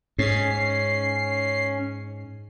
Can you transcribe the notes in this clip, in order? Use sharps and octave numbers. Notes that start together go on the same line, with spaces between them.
G#2 C#4 C7